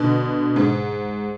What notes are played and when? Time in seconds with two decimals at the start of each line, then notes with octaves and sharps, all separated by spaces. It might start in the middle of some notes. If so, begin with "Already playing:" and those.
Already playing: B2 D3
0.56 G#2